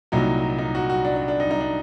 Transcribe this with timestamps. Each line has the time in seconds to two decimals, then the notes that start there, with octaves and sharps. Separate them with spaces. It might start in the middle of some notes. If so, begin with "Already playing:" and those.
0.12 C2 A#2 F#3 D#4
0.58 D#4
0.75 F#4
0.90 F#4
1.05 D4
1.16 D4
1.28 D4
1.40 D#4
1.51 D#4
1.61 D4